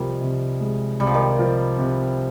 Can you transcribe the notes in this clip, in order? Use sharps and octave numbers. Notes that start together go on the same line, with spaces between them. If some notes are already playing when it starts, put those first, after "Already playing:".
Already playing: C2 D#3 F3 G3
C3
G#3
C2 G3
F3
D#3 G3
F3
C3